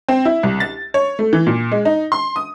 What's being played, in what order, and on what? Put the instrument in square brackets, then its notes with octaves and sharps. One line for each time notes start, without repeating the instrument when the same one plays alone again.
[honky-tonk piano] C4
E4
C2
A6
C#5
A3
E3
A#2
G#3
D#4
C6
D#6